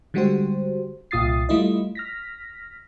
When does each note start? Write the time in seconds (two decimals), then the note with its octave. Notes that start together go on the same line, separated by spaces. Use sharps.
0.14 D3 G3 G#3 F#4 G4 C5
1.11 C2 A#2 F4 D#6 A6 C7
1.49 G3 A3 E4 F4 D#5
1.95 F6 A#6 B6